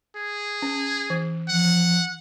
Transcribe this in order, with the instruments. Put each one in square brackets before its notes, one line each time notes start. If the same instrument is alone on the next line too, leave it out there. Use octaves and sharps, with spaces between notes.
[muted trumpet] G#4
[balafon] C#4
E3
[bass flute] F3 [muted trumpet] F#5